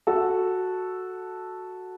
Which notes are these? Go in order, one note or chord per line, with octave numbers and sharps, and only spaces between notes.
F#4 A4